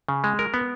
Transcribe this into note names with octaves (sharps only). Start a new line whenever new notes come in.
C#3
G#3
A#4
B3